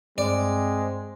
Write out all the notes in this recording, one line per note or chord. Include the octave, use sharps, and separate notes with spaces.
G2 G#3 C4 D5